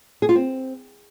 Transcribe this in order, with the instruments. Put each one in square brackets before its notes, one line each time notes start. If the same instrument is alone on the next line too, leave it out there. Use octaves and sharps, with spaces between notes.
[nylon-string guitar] G#4
F4
C4